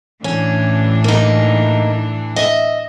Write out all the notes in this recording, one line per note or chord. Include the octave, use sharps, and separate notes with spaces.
A2 E3 C#4 D4
A#3 D#4
D#5 E5